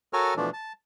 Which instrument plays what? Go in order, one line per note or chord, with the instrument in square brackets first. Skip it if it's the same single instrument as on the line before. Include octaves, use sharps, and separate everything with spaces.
[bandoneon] F#4 A4 A#4 C#5 G#5 F6
B2 E3 F3 A3 D4
A5